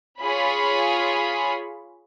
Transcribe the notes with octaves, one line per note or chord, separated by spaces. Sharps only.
F4 G#4 C#5 B5